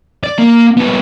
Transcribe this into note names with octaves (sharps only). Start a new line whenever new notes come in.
D5
A#3
C2 B3